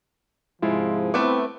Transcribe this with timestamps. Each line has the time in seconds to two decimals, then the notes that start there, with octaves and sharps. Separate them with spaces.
0.62 G#2 C3 F3 G#3 E4 F4
1.14 A3 B3 C4 E4 D6